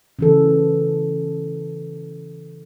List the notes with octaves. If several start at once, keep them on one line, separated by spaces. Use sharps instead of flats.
C#3 E3 A4